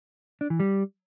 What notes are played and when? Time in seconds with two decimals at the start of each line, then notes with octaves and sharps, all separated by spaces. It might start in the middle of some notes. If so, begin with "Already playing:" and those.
0.41 D4
0.50 E3
0.60 G3